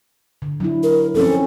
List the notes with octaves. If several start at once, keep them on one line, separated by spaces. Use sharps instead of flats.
D3
F#3 D4 E4
A#4
F3 C4 C#4 A4